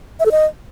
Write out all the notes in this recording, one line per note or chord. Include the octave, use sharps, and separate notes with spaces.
E5
A4
D#5